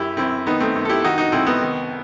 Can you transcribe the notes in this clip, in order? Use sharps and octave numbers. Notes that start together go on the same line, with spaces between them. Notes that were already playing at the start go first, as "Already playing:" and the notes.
Already playing: F#2 E4 G4
F#2 C4 E4
D#3 B3 D#4
A3 C4
F#2
A4
E4 G4
D#3 D#4 F#4
D#4 F#4
C2 C4 E4
B3 D#4
D#3